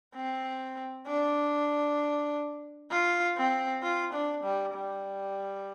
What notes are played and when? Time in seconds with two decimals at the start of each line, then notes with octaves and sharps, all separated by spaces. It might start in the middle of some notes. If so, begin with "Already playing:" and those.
0.15 C4
1.07 D4
2.91 F4
3.37 C4
3.82 F4
4.13 D4
4.43 G3
4.74 G3